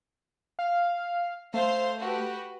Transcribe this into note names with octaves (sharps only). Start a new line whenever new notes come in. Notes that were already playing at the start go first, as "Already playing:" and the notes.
F5
A3 C5 F5 C6
F#4 G4 B4